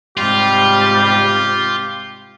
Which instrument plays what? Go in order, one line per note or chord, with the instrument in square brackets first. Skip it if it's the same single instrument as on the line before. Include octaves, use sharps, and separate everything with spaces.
[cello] G#2 C3 [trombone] G3 [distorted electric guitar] F4 [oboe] G4